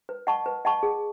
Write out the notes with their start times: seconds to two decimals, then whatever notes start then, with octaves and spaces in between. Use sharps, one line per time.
0.09 B4
0.27 D#5 F#5 A5 C#6
0.46 B4
0.65 D#5 F#5 A5 C#6
0.83 G#4